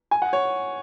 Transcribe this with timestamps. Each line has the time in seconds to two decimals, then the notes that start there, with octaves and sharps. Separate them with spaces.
0.11 G#5
0.22 F#5
0.33 C#5